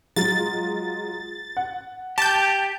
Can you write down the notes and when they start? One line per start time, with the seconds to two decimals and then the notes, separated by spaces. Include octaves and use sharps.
0.16 F#3 G#3 F4 A6
1.57 F#5
2.18 G4 A5 G6